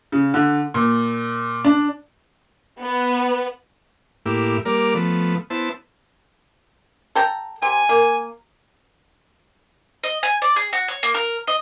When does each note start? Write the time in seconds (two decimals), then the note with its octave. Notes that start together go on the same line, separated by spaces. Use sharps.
0.12 C#3
0.34 D3
0.74 A#2
1.65 D4
2.81 B3
4.26 A2 A#3 E4 G4
4.65 G3 A#3 A#4 D5
4.95 F3 A3 B3
5.50 B3 E4 C5 A5
7.15 A4 G5 A#5
7.62 C3 G#5
7.89 A#3
10.04 D#5
10.23 G#5
10.42 D5
10.56 G#4
10.73 F#4
10.88 C#5
11.03 A#3
11.14 A#4
11.47 D#5